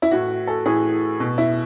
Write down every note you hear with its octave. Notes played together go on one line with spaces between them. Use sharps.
E4
A2 E3 F#4
A4
A2 E3 G#4
B2
E4